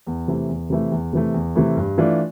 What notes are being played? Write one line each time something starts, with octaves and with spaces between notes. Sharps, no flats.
E2
C3 E3 A3
E2
C3 E3 A3
E2
C3 E3 A3
E2
C3 E3 A3
G2
E3 A3 D4 F4